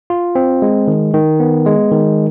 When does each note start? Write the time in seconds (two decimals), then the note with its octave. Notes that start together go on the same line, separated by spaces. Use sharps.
0.10 F4
0.35 C4
0.62 G#3
0.87 D#3
1.14 D#3
1.40 B3
1.66 G#3
1.91 D#3